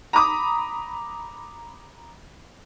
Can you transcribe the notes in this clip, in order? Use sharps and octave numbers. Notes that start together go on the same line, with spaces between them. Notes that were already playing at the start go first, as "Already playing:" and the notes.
A#5 B5 D6 D#6